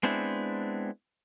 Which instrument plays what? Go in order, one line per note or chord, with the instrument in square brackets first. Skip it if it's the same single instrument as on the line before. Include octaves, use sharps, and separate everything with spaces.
[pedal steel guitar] G#3 B3 C4 D4 E4